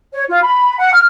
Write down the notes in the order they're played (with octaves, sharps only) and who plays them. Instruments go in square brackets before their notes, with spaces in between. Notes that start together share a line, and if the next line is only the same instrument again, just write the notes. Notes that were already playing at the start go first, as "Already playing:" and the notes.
[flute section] C#5
F4
B5
F#5
F6